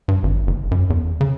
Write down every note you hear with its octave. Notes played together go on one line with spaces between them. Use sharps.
G2
G#1
F#1
F#2
E2
C#3